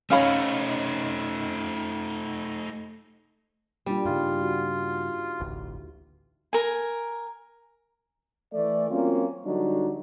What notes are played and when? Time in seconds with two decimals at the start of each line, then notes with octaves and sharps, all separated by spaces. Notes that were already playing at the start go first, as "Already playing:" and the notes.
0.10 A3 C#4 D#4 F5 B5
3.86 G3 A#3 D4 F4
4.05 G2 C#3 D#4 F4 G4
4.41 F#4
5.40 E1 A1 D2
6.53 A#4 G#5
8.54 E3 A3 D5
8.90 F#3 A#3 C4 C#4 F4
9.45 D3 F#3 G3 D4 D#4 F#4